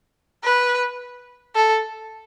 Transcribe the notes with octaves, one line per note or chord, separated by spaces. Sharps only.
B4
A4